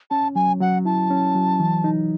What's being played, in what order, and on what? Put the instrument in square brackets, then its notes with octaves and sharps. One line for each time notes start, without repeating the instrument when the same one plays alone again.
[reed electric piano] C#4 [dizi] A5
[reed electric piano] F#3 [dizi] G#5
[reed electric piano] F#3 [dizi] F#5
[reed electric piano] E4 [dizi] A5
[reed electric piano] C#4
F#3
E3
D#4